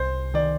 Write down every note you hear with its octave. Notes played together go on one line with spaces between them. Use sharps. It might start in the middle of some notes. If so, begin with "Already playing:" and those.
Already playing: C2 C5
D#3 D5